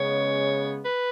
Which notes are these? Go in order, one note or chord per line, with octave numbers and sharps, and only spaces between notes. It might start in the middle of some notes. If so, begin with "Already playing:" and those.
Already playing: C#3 G#3 B3 C#5
B4